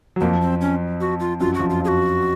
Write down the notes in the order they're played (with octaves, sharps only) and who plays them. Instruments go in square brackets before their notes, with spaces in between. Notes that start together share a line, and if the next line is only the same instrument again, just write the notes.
[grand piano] F#3
[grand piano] F2 F3 [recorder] A#3
[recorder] C4
C#4
F#4
F4
[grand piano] F#2 F#3 [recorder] F4
[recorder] F#4
[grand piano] F2 F3
[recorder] F4
[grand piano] F2 F3 [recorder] G#4
[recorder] F#4